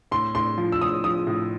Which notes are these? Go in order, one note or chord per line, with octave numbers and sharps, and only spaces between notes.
A2 C6
A2 C6
F3
E6
A2 D#6
F3 D#6
A2